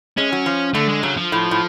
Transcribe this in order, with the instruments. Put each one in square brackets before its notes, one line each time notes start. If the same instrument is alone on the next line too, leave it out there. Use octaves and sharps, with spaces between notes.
[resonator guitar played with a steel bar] G#3 [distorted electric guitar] C#4
[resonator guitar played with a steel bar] F#3
F3
[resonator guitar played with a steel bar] D3 [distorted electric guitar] A3
[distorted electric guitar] G#3
[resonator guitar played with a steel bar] C#3 [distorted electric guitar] F#3
[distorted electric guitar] F3
[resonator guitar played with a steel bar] A2
A2